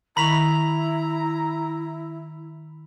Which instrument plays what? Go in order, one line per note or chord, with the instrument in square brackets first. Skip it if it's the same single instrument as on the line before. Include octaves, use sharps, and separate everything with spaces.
[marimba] D#3 C#6 [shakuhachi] E4 [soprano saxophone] A#5 [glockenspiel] B5 B6 F7